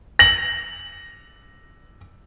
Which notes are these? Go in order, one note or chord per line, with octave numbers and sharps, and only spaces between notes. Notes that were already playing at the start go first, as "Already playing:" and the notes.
A#6 F#7